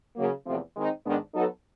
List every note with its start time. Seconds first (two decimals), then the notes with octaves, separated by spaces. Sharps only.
0.15 C#3 F#3 A#3
0.46 E2 C3 F3 A3 C4
0.75 D#3 G#3 C4 D#4
1.05 G#2 D#3 G#3 B3 D4
1.35 F#3 B3 D#4 F#4 A4